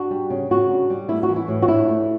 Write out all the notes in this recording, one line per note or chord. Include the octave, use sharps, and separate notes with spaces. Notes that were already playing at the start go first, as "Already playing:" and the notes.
Already playing: D4 F#4
G3
C#3
C#3 F#4
D4
G3
A3 E4
F#4
E3
E4
A2
F#4
D4 E4
A3